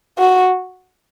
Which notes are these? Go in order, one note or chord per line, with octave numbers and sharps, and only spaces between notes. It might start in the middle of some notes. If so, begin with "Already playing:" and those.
F#4